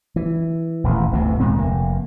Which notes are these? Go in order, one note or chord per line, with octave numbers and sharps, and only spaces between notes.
E3
D#1 A1 E2
G1 D2 A2 C3
D#2 A#2 G#3 C4
F1 A#3